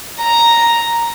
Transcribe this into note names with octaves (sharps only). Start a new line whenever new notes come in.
A#5